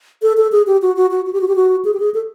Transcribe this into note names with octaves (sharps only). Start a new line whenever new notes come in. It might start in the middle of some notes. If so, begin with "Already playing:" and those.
A4
A4
G#4
G4
F#4
F#4
F#4
F#4
G4
F#4
G4
F#4
G#4
G4
G#4
A4